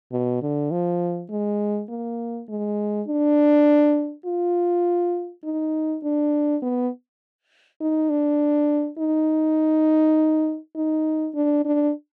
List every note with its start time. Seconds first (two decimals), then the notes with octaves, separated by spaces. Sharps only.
0.12 B2
0.42 D3
0.71 F3
1.30 G#3
1.89 A#3
2.49 G#3
3.08 D4
4.26 F4
5.44 D#4
6.03 D4
6.62 B3
7.81 D#4
8.10 D4
8.99 D#4
10.76 D#4
11.35 D4
11.65 D4